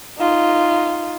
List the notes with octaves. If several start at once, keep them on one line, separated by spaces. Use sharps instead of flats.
D#4 F4